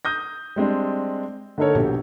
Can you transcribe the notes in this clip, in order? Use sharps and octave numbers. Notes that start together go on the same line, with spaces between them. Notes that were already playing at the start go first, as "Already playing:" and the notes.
D#6 G6 A#6
G3 G#3 C4 D4
D3 A#3 D#4 A4 A#4 C#5
A#1 B2 G4